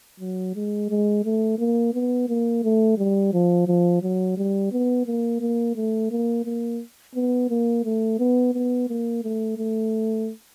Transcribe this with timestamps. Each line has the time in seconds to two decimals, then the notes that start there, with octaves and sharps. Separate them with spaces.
0.20 F#3
0.55 G#3
0.90 G#3
1.24 A3
1.59 A#3
1.94 B3
2.29 A#3
2.64 A3
2.98 G3
3.33 F3
3.68 F3
4.02 F#3
4.37 G3
4.72 B3
5.06 A#3
5.41 A#3
5.76 A3
6.11 A#3
6.45 A#3
7.15 B3
7.50 A#3
7.84 A3
8.19 B3
8.54 B3
8.89 A#3
9.23 A3
9.58 A3